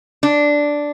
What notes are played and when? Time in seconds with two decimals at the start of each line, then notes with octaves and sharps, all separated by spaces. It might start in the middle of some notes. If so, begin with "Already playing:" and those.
0.23 D4